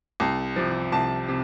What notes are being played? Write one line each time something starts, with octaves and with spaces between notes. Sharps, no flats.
C2 A5
C3 F3
C2 A5
C3